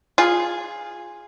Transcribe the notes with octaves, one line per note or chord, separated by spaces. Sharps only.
F4 G#4